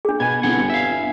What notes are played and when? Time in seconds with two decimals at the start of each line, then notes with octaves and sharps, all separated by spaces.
0.05 D4 G#4
0.20 B2 B3 G#5 G#6
0.43 G1 C4 E4 F#5
0.70 E5 F5